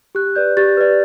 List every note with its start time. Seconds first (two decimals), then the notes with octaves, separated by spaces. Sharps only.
0.15 G4 F#6
0.35 B4 D5 G6
0.57 G4 A6
0.77 B4 D5